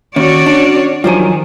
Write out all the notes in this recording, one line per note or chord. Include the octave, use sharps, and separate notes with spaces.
D#2 C#4 F#4 C#5 D5
D4
G2 D#3 F3 F#3 F4 C5 G#5